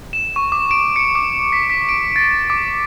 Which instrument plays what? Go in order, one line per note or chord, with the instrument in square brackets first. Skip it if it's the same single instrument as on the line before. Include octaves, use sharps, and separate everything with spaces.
[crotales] E7
C#6
D6
D7
C#7
D6
B6
B6
D7
A6
D6